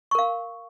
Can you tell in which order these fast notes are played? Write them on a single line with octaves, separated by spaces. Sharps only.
C#6 A#4 F5